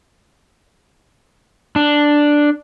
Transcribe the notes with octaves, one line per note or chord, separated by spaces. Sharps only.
D4